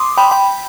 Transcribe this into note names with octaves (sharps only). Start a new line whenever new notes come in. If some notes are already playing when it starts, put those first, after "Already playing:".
Already playing: C6 D6 D#6
G5 B5
G5 B5